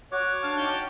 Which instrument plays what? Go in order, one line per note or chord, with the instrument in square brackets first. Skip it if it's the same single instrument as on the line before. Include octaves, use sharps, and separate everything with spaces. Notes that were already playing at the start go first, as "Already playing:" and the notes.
[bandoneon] F#4 D6 [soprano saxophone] C#5 [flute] F#6
[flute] D4 [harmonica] F5 A5 F6
[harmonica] C#4 G5 A5 [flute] D#4